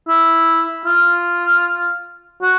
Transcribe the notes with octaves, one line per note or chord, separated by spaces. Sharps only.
E4
F4
F#4